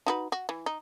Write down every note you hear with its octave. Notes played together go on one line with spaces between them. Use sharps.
D#4 F#4 B4
F#4
E3
D#4